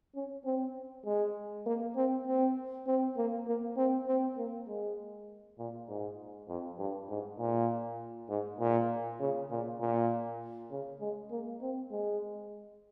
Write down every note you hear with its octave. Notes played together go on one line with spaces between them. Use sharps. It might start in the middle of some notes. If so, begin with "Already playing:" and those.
C#4
C4
G#3
A#3
C4
C4
C4
A#3
A#3
C4
C4
A#3
G#3
A#2
G#2
F2
G2
G#2
A#2
G#2
A#2
C#3
A#2
A#2
C#3
G#3
A#3
C4
G#3